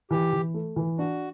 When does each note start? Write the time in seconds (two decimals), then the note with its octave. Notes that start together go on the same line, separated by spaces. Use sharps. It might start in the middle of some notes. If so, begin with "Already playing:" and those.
0.11 E3 G4
0.33 E3
0.54 A3
0.76 E3
0.99 D4 F#4